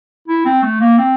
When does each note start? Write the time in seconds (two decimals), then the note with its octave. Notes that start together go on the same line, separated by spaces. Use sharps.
0.28 E4
0.45 C4
0.62 A3
0.80 A#3
0.98 C4